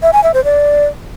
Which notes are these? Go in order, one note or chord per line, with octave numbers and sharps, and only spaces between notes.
E5
G#5
E5
C5
D5